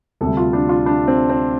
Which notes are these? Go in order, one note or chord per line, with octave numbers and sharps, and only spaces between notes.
D2 C3 G3 A4
F4
D4
F4
D4
C4
C4